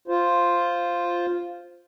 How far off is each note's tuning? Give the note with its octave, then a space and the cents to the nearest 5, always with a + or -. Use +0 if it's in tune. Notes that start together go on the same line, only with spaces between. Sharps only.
F4 +0 C5 +0